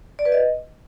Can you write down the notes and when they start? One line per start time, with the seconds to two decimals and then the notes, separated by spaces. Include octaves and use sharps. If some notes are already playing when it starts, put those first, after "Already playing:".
0.19 D5
0.25 B4
0.32 D#5